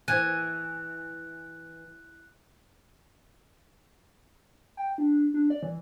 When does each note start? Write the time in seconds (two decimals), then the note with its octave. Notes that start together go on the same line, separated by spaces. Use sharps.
0.08 E3 G#5 F#6
4.77 G5
4.98 D4
5.34 D4
5.50 D5
5.63 E3